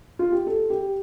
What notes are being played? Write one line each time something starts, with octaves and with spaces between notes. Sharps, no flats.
F4
G4
A4
G4